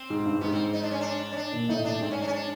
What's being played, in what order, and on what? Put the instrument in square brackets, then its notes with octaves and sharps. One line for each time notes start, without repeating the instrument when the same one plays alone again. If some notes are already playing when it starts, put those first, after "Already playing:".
Already playing: [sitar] C4
[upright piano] G#2
G2
[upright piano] G#2 [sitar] B3
[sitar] C4
D#4
D4
C#4
D4
C#4
D4
[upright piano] A#2
[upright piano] A2 [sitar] D#4
[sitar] D4
[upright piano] G#2 [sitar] C4
[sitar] C#4
D4
C#4
D4